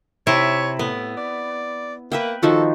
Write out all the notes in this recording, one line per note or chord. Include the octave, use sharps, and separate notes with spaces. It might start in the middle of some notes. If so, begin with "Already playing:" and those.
C3 E4 C#5
A2 B3
D5
A#3 B4 E5 G5
D#3 F3 F#4 A4